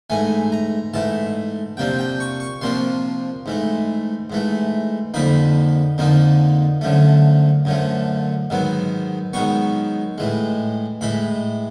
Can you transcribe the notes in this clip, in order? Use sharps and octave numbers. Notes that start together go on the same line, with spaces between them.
G#2 E3 A3 G#5
A#5
G#2 E3 A3 A5
C3 F3 A#3 D4 G5
G5
C#6
C#6
C3 F3 A#3 D4 C6
G#2 E3 A3
G#2 E3 A3
F2 D3 F3 A#3 D#4 B5
F2 D3 F3 A#3 D#4
F#2 D3 F3 A3
F#2 D3 F3 A3
G#2 D#3 F#3 B3
G#2 D#3 F#3 B3 C#6
A2 E3 G#3
A2 E3 G#3 B5